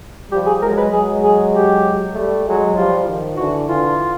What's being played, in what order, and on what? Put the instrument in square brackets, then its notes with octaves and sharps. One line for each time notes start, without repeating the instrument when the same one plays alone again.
[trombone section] F3 G3 [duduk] G4
[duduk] G#4
[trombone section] F#3 G#3 [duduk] A#4
[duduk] B4
[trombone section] F#3 G#3 [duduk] G#4
[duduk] G#4
G4
[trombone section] G3 A3
F#3 G#3
[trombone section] F3 G3 [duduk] F4
[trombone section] D#3 F3
[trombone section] D3 E3 [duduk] F#4
[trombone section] D3 E3 [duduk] F4